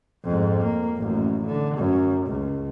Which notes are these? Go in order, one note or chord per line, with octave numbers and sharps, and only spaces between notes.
F2 G#2
A#3
A1 F#2
D3
F#2
C#2